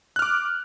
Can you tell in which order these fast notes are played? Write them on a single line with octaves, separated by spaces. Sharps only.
F#6 F6 D6